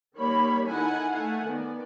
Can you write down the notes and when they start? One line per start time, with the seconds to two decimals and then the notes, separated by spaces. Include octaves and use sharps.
0.18 D#3 G3 A#3 C#5 B5
0.69 D#3 D#4 E4 A4 F#5 G#5
1.14 A3 A4 F5 F#5 G#5
1.45 D#3 B3 D5